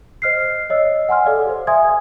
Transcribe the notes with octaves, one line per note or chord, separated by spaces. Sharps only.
C5 D#5 F6 F#6 C7
C#5 D#5 E6
F#5 G#5 C6 F6
A4 D5 F5
G4 C5
E5 G#5 C6 D#6 G#6